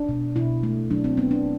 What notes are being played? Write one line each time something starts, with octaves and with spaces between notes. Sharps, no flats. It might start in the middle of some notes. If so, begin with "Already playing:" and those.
Already playing: D4
B2
B2 E4
A3
F#3 D4
C4
B3 C4
D4